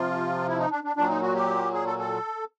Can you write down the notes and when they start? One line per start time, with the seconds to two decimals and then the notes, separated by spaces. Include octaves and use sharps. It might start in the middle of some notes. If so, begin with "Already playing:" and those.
Already playing: C3 F3 F4
0.48 E4
0.58 D#4
0.71 D4
0.84 D4
0.96 A#2 F#3 D4
1.09 D#4
1.22 F#4
1.35 G4
1.73 G#4
1.86 A4
1.99 A4